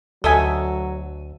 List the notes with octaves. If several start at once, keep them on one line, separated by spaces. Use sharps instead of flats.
D2 F#3 A4 D#5 E5 G#5